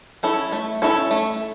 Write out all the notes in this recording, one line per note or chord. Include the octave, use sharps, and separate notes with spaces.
C#4 E4 A4 C#5
A3
C#4 E4 A4 C#5
A3